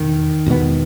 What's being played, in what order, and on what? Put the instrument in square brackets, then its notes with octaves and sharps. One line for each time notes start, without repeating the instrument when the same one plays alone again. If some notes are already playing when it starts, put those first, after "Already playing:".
Already playing: [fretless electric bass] E2 B2 [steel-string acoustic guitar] D#3
[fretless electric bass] E2 B2 G#3 B3